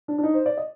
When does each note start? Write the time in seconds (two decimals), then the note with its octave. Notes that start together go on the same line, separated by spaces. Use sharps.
0.08 D4
0.18 D4
0.24 D#4
0.34 C5
0.46 D5
0.57 D#5